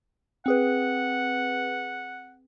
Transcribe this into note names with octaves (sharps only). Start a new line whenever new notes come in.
C4 G#4 B4 F#5